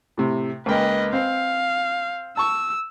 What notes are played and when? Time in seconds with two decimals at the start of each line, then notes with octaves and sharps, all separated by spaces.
0.17 A2 C3
0.66 C#2 A#3 B4 D#5 G5
1.13 C4 F5
2.37 A5 C#6 E6